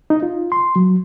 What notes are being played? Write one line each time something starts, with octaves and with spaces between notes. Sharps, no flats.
D#4
F4
C6
F#3